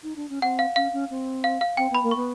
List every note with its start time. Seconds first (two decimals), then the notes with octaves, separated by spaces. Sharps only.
0.03 D#4
0.16 D4
0.29 C#4
0.42 C4 F#5
0.59 F5
0.76 C#4 F5
0.93 C#4
1.10 C4
1.44 F5
1.61 F5
1.77 C4 G5
1.90 B3 B5
2.03 A#3
2.11 B3 C#6